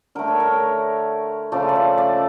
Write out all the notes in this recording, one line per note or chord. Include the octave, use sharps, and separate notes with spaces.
D3 A3 A#4
C#5
A#4
C#3 F3 A3 D5
D5
E5
D5